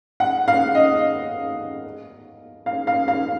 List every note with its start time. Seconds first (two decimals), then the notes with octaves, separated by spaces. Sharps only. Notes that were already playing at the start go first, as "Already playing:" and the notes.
0.20 F#5
0.48 F5
0.75 D#5
2.66 F5
2.87 F5
3.08 F5